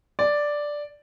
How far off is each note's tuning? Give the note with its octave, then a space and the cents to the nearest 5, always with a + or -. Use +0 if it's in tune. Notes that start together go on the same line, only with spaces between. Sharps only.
D5 +0